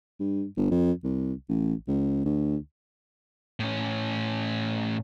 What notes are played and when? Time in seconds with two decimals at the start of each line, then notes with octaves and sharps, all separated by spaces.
0.20 G2
0.57 G1
0.71 F2
1.04 C2
1.49 A1
1.88 C#2
2.25 D2
3.60 A2 C#4